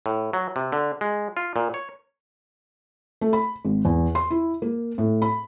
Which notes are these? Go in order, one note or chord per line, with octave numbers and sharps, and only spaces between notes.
A2
F#3
C3
D3
G#3
F4
A#2
C#5
A3
B5
G#1
E2
C6
E4
A#3
A2
B5